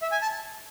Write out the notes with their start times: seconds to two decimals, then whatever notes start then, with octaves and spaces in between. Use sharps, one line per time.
0.02 E5
0.12 G#5
0.22 A5